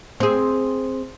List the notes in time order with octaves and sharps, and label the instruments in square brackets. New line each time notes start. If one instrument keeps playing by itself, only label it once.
[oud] C4 G#4